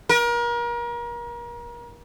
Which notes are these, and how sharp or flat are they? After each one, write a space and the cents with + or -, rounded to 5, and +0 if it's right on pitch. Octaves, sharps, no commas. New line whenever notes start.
A#4 +35